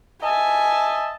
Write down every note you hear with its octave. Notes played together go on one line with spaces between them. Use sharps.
D#5 E5 G#5 A5